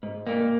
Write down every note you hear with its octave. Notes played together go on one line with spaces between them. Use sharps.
G#2
A#3